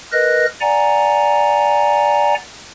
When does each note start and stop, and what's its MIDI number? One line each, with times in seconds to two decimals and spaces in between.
0.12 0.46 70
0.12 0.46 71
0.12 0.46 75
0.12 0.46 90
0.12 0.46 94
0.61 2.35 74
0.61 2.35 78
0.61 2.35 80
0.61 2.35 82